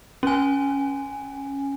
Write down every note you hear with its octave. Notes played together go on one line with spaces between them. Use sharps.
C#4 G#5